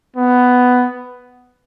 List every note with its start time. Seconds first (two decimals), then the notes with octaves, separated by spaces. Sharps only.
0.17 B3